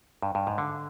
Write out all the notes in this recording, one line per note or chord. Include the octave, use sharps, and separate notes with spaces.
G2
G2
G#2
D3